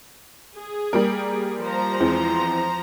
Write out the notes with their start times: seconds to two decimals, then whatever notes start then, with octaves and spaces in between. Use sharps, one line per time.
0.56 G#4
0.93 G3 A#3 A#4
1.62 F3 C5 A#5
2.00 E2 G#3 C4